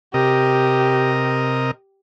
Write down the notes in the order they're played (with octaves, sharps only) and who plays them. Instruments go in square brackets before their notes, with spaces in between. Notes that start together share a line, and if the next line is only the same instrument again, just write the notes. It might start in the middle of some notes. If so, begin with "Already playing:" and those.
[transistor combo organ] C3 A#4 D#5 [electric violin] G4